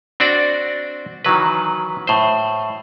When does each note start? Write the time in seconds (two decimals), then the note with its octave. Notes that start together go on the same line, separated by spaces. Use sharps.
0.20 C4 D4 F#4 D5
1.25 D#3 E3 F#3 B4
2.07 A2 C5